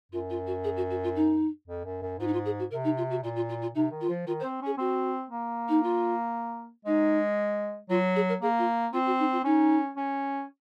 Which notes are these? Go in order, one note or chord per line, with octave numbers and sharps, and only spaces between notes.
F#2 F4
F4
F#4
G#4
F#4
F#4
F4
D#4
F2
F#2
F#2
G#2 F4
D#4
F4
G#4
F#4
C3 A#4
D#4
F4
F#4
A#2 F4
F4
F4
F4
C3 D#4
D#3
F4
F3
D#3 F4
C5
C4
C#4 G#4
C4 F#4
A#3
D#4
F4
G#3 D#4
F#3 F4
G#4
A#4
A#3 G#4
F4
C4 F4
F#4
D#4
F4
C#4 D#4
C#4